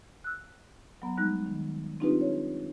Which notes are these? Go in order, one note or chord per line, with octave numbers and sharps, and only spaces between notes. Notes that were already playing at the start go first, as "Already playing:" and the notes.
E6 F#6
F#3 B3 A#5
G3 G#3 D#4 F#6
D#3
C4 D4 D#4 F4 G4 B4
C#5